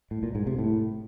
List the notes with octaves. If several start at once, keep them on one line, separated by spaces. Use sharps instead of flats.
A2
A#2
G#2
C3
A2